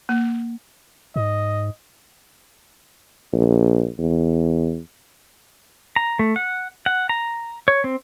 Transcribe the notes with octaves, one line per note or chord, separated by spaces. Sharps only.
A#3
G#2 D#5
A#1
E2
A#5
A3
F#5
F#5
A#5
C#5
C4